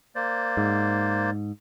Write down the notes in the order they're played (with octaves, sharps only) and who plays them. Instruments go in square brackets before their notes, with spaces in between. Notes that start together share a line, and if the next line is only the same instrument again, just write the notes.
[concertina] A#3 C5 D5
[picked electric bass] G#2